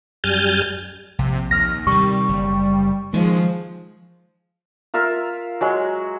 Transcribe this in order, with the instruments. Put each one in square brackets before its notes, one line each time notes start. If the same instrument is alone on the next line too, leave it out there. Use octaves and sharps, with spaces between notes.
[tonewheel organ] F#2 G3 G#5 F6 G6 A6
[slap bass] A#1 [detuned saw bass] C3
[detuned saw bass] D#2 [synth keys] F6 A#6
[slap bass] C3 D#3 [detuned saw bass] G3 [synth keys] C#6
[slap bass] F#1
[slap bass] D#3 [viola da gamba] F3 [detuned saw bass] G#3
[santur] F4 A#4 E5
F#3 G#3